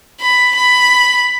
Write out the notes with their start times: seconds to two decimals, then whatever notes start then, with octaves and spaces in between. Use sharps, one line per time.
0.21 B5
0.56 B5